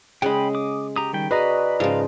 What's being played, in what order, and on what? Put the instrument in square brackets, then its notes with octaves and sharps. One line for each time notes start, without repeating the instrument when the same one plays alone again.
[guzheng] C#3 C#5 F#5 [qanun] G#3 D#5 [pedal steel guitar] G5 B5
[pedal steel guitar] D6 D#6
G4 A#5 D#6
D#3 G3 G5
[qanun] F#4 G#4 D5 [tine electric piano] B4 D#5 A#5 [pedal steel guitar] B5
[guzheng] G#2 C#3 [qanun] F3 [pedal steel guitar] F5